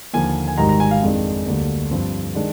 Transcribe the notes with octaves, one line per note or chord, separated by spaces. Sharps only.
D#2 D3 F3 A#3 G#5
G#5
G#1 G#2 D#3 G3 A#5
A#5
G#5
F5
F2 D#3 G#3 D4
D2 D3 G3 A#3 D4
G2 F3 C4
D#3 G#3 D4